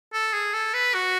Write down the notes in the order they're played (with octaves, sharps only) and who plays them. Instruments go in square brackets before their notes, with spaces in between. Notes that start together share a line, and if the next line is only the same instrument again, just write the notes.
[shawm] A4
G#4
A4
B4
F#4